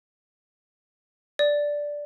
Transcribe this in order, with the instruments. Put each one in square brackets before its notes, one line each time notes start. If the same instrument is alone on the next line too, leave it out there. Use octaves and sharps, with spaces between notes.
[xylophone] D5